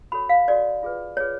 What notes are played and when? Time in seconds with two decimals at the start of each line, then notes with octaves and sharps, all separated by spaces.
0.12 F#4 A4 C#5 B5
0.29 F5
0.48 F#4 A4 C#5 D5
0.83 F4 G#4 B4
1.17 F4 G#4 B4 C#5